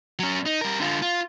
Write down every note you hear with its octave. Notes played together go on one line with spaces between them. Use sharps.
F#3 C#4
D#4
G3 A#4
D3 F4
F4